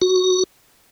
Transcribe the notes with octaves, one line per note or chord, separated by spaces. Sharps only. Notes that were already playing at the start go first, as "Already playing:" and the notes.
F#4